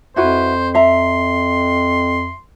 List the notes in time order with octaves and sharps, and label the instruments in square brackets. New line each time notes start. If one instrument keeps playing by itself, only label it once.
[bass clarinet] F2 [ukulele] E4 F#4 B4 [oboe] C5
[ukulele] E5 A#5 [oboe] C6